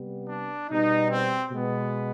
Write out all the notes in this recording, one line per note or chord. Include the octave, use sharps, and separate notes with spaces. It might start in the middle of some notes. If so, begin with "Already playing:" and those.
Already playing: C3 G3 B3
D4
B2 G3 B3 D#4
C4
B2 G#3 B3